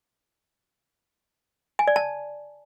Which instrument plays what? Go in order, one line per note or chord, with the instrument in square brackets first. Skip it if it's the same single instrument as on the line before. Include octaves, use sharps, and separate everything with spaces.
[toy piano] G#5
D5
A5